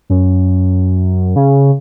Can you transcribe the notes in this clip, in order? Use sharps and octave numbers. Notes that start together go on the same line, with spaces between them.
F#2
C#3